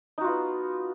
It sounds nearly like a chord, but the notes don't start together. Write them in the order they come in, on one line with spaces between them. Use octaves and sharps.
D#4 F#4 F4 B3